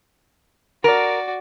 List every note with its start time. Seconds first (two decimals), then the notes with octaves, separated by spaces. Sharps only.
0.84 F#4 A#4 D5